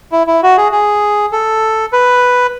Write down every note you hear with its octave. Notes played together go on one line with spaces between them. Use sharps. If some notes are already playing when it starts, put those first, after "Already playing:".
E4
E4
F#4
G#4
G#4
A4
B4